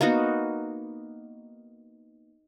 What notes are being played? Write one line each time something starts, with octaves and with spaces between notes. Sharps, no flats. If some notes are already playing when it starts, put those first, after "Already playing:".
A#3 B3 D#4 F#4